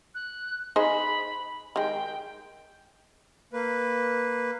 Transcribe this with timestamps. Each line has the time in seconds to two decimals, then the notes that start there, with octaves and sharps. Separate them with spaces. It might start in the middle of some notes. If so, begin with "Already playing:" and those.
0.15 F#6
0.76 D#4 G#4 C5 B5
1.76 D#3 G#3 G5
3.53 A#3 B4